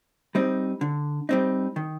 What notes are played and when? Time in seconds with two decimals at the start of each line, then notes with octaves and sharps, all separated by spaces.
0.35 G3 C4 D#4
0.81 D3
1.29 G3 C4 D#4
1.76 D#3